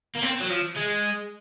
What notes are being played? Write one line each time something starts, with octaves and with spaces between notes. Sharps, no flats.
A#3
C4
F#3
F3
G#3